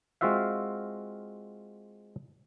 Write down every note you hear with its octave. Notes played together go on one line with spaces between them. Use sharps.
G#3 C4 F4 F#4 E5 F5